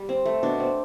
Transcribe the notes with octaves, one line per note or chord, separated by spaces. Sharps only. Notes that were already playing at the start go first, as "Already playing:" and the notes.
Already playing: G3
C4
A3
B2 D4
C4